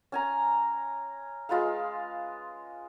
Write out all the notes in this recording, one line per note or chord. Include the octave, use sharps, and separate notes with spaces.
C#4 G#5 A#5
G#3 F4 B4 F5